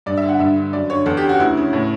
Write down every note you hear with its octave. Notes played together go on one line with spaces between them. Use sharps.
G2 D5
E5
D3
F#5
G2 E5
D3
F#2 D5
D3 C#5
E2 A4
G4
C#3
F#4
D2 E4
C#3
A2